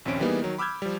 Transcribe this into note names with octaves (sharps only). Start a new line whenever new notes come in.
A#1 D#2 C4 C#4 D7
E3 G3 A#3 B3 D#4 G#4
D#3 F#3
B5 D6 E6 F6 G6 G#6
F3 G3